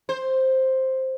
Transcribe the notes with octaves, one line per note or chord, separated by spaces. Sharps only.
C5